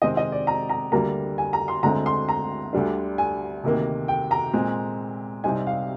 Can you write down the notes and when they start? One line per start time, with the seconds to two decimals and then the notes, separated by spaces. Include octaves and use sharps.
0.02 C3 D#3 G#3 C4 D#5
0.17 D#5
0.32 D5
0.47 A#5
0.69 A#5
0.92 D2 D3 G3 A#3 A#5
1.38 G#5
1.53 A#5
1.68 C6
1.83 D2 D3 G#3 C4 A#5
2.06 C6
2.28 A#5
2.73 D2 D3 G3 D4
3.18 G#5
3.64 D2 C3 D#3 A#3
4.08 G5
4.31 A#5
4.53 A#2 G#3 C4
5.44 C2 C3 G3 C4 D#4 G#5
5.67 F5